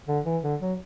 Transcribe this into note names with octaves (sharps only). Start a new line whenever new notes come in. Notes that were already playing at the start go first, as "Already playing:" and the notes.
D3
E3
D3
F#3